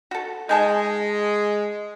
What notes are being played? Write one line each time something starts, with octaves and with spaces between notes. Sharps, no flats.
F#4 A4
G#3 D#4 G#5 A5